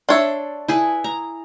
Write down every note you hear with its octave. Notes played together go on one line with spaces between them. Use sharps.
D4 C#5 E5 C6
E4 G#4 B4
A#5